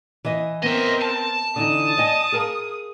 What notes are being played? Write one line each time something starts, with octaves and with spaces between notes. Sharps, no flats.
E3 D#5
B3 C4 A#4 D#5 E5
A5
D3 E3 D#4 D#6
D5 D#5 G#5
G#4 A#4 F5